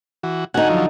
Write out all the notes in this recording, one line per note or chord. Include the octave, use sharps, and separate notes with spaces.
E3 F#4
D3 D#4 F#4 F#5 G#5
F3 F#3